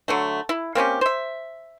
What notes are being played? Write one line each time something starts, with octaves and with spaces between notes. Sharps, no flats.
D3 F#3 A3
E4
A#3 C4 C#4 G4
C5 E5